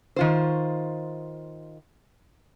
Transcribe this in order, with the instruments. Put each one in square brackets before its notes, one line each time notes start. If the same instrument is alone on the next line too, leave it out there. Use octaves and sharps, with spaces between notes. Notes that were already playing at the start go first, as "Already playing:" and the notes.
[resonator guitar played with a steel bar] D#3 F4 C5